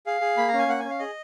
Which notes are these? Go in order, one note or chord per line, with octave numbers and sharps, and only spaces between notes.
G#4 F5
G#4
A#3 B5
A#5
C#4
G#5
A#3 F#5
C#4 G#5
F5
G#4 D#5